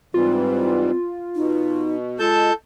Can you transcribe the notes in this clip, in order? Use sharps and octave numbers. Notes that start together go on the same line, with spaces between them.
G#2 E3 G3 C4 F4
B2 D#4
G#3 F4 A4 A5 G6